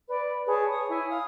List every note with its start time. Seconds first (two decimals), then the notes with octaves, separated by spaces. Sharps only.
0.08 B4 D5
0.47 G#4 B4 C#5 A5
0.69 C#5 D#6
0.88 E4 G#5
1.09 F5 D#6